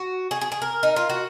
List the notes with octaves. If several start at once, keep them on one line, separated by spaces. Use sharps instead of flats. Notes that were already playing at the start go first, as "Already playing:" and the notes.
Already playing: F#4
G#4
G#4
G#4
A#4
D#4
F4
F#4